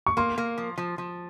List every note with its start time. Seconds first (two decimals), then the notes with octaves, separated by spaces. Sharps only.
0.06 C#6
0.17 A#3 C6
0.38 A#3
0.58 F3
0.78 F3
0.98 F3